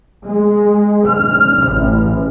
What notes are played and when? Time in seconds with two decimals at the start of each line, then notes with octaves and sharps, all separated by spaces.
0.24 G#3
1.07 F6
1.68 A1